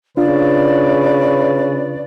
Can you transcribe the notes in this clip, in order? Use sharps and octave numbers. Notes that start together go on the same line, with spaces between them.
C#3 D4 F4 B4 D5